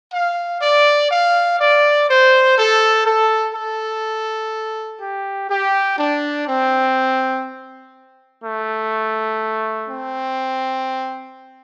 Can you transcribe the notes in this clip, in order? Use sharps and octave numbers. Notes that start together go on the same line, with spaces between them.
F5
D5
F5
D5
C5
A4
A4
A4
G4
G4
D4
C4
A3
C4